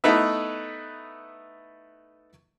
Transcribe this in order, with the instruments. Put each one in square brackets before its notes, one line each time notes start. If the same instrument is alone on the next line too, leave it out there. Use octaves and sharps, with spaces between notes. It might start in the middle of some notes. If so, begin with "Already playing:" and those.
[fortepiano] A3 B3 D#4 E4 B4 E5